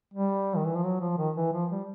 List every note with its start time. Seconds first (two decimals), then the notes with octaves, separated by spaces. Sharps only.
0.14 G3
0.56 D#3
0.65 E3
0.75 F3
0.84 F#3
1.01 F3
1.18 D#3
1.37 E3
1.53 F3
1.71 G3